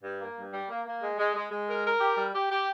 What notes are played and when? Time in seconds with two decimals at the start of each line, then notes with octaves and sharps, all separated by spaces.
0.03 G2
0.19 A#3
0.36 G2
0.52 G3
0.69 A#3
0.85 A#3
1.01 G#3
1.18 G#3
1.35 G#3
1.51 G#3
1.67 A#4
1.85 A#4
2.00 G4
2.17 G3
2.33 G4
2.50 G4